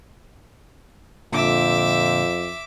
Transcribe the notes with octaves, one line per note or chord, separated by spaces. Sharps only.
F2 A#2 D3 E5 D6